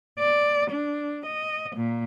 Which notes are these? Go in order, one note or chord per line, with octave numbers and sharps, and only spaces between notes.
D5
D4
D#5
A#2